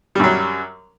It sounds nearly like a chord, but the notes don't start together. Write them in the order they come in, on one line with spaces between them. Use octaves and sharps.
G3 F#2 F#3